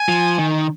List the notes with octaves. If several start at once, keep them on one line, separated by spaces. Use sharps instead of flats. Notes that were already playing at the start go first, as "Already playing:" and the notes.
Already playing: G#5
F3
D#3